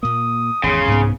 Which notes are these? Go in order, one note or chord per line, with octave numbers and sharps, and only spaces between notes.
A#2 A#3 D#6
G#1 E2 C#3 C6
C2 G#2 B3